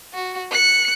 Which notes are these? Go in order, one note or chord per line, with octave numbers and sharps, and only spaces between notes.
F#4
F#6 C#7